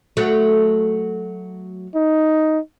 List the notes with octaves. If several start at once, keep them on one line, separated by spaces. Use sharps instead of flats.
F#3 A3
D#4